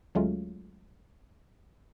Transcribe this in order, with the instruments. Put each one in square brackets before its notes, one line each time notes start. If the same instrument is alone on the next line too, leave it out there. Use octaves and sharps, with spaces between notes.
[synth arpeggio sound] D2 F#3 G#3 A3 C#4 F4